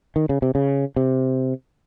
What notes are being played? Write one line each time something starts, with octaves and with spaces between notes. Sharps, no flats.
D#3
C#3
C3
C#3
C3